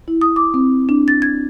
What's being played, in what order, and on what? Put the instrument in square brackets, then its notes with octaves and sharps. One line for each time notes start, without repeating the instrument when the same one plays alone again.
[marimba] E4
D#6
D6
C4
D4
A6
G#6